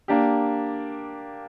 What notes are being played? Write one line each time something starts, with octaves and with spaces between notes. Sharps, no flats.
A#3 D4 G4